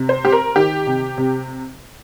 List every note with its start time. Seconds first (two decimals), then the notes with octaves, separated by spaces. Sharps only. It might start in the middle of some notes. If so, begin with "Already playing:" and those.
Already playing: C3
0.09 C5
0.24 C4 G4
0.32 A#4
0.55 D#3 G4
0.87 C3
1.18 C3